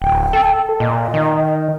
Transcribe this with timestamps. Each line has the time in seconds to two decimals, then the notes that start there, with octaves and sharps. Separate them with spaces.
0.02 D1 G5
0.33 A4
0.80 A#2 D#5
1.14 D#3